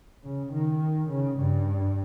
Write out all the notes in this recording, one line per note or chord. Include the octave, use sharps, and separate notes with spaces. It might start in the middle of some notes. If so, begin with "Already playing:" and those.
C#3
D#3
C#3
G2